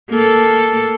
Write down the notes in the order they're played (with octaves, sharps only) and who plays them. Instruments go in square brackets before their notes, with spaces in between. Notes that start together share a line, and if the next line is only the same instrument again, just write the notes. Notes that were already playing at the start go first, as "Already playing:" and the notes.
[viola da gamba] A#3 A4